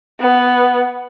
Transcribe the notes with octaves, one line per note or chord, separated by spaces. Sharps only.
B3